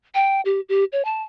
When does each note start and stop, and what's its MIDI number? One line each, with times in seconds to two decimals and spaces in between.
0.15 0.41 79
0.45 0.61 67
0.69 0.84 67
0.92 1.02 73
1.05 1.22 81